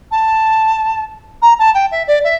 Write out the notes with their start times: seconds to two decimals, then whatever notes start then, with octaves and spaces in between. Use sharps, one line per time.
0.11 A5
1.42 A#5
1.59 A5
1.74 G5
1.91 E5
2.07 D5
2.24 E5